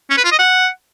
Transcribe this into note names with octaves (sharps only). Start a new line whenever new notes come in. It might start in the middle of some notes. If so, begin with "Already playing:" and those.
C#4
B4
F4
D#5
F#5